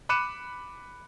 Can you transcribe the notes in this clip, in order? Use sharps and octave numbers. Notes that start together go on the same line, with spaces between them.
B5 D6 F#6 C#7 D#7 E7